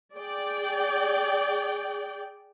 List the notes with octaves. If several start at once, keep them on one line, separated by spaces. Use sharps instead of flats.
G#4 D5 G5